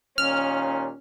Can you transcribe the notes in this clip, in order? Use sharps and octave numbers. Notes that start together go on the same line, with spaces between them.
D#2 A#2 C#4 F6